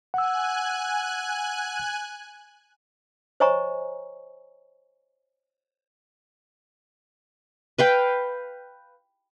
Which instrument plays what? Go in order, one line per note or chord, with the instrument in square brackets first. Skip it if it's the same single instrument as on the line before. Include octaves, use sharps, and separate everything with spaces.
[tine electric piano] F#5 E6 [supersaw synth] G#5 F#6
[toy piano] C5 C#5 D#5 G#5 A#5 C#6
[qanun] B4 F5 G5